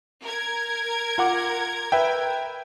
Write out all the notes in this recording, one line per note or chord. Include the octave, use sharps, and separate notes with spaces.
A#4 G#6
F4 F#5 D6
B4 E5 G5